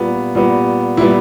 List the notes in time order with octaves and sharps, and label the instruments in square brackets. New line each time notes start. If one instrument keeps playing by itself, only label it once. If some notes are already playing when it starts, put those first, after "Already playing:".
Already playing: [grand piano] A#2 G3 B3
A#2 G3 B3
A#2 G3 B3 E4